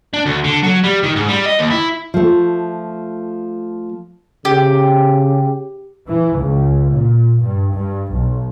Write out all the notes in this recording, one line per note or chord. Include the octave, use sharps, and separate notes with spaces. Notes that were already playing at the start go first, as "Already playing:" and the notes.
D4
D2
D3
F#3
G3
D#3
G#2
G3
D#5
D#2
E4
F3 A3
C#3 G4
E3
C#2
A#2
G2
G2
B1